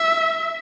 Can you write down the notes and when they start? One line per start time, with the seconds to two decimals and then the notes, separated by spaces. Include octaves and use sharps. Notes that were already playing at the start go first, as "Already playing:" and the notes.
Already playing: E5